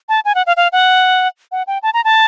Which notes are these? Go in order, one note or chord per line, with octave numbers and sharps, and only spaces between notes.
A5
G#5
F#5
F5
F5
F#5
F#5
G5
A5
A#5
A5